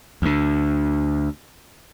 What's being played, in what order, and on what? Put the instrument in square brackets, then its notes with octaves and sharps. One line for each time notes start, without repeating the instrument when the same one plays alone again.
[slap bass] D2 D3